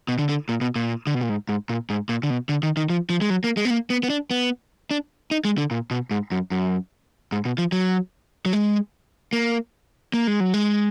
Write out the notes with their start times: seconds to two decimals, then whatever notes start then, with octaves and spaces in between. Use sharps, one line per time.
0.08 B2
0.19 D3
0.29 D3
0.49 A#2
0.61 B2
0.76 A#2
1.07 D3
1.14 B2
1.21 A#2
1.29 G#2
1.49 G#2
1.70 A#2
1.90 G#2
2.09 A#2
2.23 D3
2.30 B2
2.49 D3
2.63 D#3
2.77 D#3
2.90 F3
3.10 F3
3.21 G#3
3.30 F#3
3.44 A#3
3.57 G#3
3.65 B3
3.70 A#3
3.90 B3
4.03 B3
4.10 D4
4.31 B3
4.91 D4
5.31 D#4
5.45 G#3
5.58 D3
5.71 A#2
5.91 B2
6.11 G#2
6.31 F#2
6.51 F#2
7.32 G#2
7.45 B2
7.58 F3
7.72 F#3
8.46 F#3
8.53 G#3
9.33 A#3
10.14 A#3
10.27 G#3
10.40 F#3
10.54 G#3